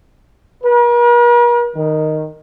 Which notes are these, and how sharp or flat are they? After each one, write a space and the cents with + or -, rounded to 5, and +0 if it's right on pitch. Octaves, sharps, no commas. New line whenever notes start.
A#4 +45
D#3 -5